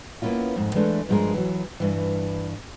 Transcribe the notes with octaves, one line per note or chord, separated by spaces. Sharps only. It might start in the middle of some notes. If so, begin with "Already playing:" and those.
A#3 B3 C#4 E4 F4
F2 G#2
E3 G#3 A3 D4
G2 F3 G#3 C4 G#4 A#4
E3 F#3
G2 E3